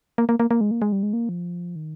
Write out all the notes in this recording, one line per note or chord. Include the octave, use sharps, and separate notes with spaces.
A#3
A#3
A#3
A#3
G#3
A#3
G#3
G3
G#3
A#3
F3
D#3